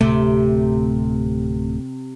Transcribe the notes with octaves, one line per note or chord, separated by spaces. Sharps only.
D1 C2 C3 A3